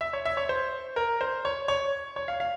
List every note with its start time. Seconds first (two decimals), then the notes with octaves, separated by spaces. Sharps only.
0.01 E5
0.13 C#5
0.25 E5
0.37 C#5
0.49 C5
0.96 A#4
1.21 C5
1.45 C#5
1.68 C#5
2.16 C#5
2.28 F5
2.40 F5